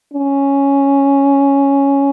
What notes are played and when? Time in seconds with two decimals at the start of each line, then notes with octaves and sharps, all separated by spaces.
0.13 C#4